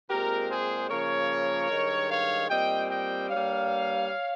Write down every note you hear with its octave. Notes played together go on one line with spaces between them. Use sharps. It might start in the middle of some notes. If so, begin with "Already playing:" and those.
A#2 G#3 C4 G4 A#4
G#4 C5
C#3 F3 A#3 A#4 C#5
G2 D#3 G#3
C#5 F5
A#2 G3 C4 D#5 G5
D#5 G5
G2 G3 A#3 C#5 F5